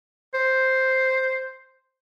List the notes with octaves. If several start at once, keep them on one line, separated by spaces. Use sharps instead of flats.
C5